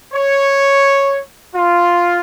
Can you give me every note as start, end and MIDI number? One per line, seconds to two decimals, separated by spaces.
0.14 1.20 73
1.55 2.20 65